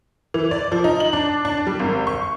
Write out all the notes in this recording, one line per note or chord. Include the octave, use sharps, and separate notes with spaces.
E3
D5
F3
D#4
F#7
D4
D4
G3
G#1
C#6